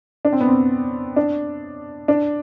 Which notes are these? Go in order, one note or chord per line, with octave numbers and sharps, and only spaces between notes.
D4
C4
B3
C4
D4
D4